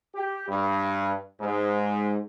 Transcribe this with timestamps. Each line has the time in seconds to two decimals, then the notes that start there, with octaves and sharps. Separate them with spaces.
0.15 G4
0.48 G2
1.40 G#2